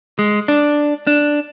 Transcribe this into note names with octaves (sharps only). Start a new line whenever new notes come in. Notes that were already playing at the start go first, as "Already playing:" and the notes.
G#3
D4
D4